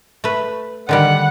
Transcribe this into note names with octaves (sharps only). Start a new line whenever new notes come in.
A3 B4
D3 D#3 G3 F#5